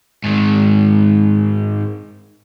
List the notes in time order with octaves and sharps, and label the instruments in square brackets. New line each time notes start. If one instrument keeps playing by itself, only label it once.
[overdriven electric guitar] G#2 D#3